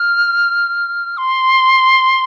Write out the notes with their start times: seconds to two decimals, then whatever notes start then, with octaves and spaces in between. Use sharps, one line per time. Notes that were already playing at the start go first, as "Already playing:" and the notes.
Already playing: F6
1.17 C6